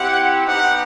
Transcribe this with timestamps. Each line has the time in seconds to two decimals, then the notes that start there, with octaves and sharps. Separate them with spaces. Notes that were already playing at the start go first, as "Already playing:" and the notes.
Already playing: C4 E4 G4 F#5
0.46 B3 D#4 G4 F#5